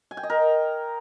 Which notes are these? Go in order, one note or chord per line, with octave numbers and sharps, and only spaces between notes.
G#5
G5
D#5
A#4